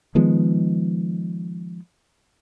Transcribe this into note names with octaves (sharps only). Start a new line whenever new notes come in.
D#3 F3 G#3 B3